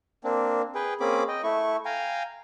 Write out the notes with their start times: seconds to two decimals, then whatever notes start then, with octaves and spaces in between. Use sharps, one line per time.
0.24 A#3 C4 D4
0.75 G#4 B4 G5
1.00 A#3 C4 C#4 G#4 B5 D6
1.28 D#5 G5
1.43 A3 E4 C#6
1.85 F5 G5 G#5 A#5